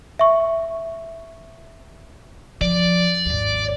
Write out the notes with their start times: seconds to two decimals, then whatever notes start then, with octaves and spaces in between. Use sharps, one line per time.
0.19 E5 C#6
2.61 F3 D5
3.26 G#1 D#2